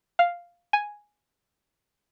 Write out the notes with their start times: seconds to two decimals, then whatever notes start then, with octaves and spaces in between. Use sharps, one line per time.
0.19 F5
0.73 G#5